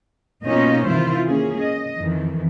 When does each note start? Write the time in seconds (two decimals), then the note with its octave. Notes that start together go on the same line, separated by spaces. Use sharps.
0.45 B2 A#3 C#4 D#4 F4 D#5
0.86 C3 D#3 E3 E4 F4 C5
1.27 A#3 C#4 G#4
1.61 D#5
1.98 F2 D#3 E3